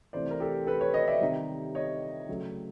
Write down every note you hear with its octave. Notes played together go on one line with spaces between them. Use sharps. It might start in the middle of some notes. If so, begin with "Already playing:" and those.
C3 E3 A3 C5 D5
A#4
G4 A4
A4 B4
B4 C#5
C#5 D#5
D5 E5
C3 D#3 G3
C#5 D#5
C#3 F#3 A3